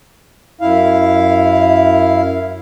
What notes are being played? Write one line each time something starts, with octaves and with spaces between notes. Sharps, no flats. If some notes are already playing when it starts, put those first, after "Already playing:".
F#2 E4 F5